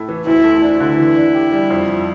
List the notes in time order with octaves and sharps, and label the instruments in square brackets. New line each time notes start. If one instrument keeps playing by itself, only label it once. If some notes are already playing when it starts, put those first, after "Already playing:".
Already playing: [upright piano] A2 A3 E4
E3
[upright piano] D2 [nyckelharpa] E4
[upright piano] A3
[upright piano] D4 [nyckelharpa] E4
[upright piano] D3
E3
D4
G4
G3
F2
F3